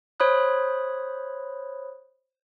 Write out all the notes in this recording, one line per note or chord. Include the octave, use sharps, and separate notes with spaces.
C5 C#5 B5 D#6 F#6